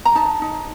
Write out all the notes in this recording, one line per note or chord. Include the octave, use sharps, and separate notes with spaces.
A#5
D#4 A5
D#4